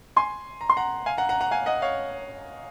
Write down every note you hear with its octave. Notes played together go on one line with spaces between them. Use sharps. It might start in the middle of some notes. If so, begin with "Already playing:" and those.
G#5 C6
A#5
C6
F#5 A#5
F5 G#5
F#5 A#5
F#5 A#5
F#5 A#5
F5 G#5
D#5 F#5
C#5 F5